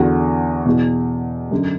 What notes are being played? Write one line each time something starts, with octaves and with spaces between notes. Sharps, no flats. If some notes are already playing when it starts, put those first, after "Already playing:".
Already playing: E2 D3 F#4
E2 B2
F#2 D3